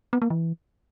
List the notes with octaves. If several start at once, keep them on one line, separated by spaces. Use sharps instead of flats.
B3
A#3
E3